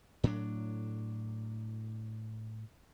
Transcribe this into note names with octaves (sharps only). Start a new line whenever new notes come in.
A2 F#3 D4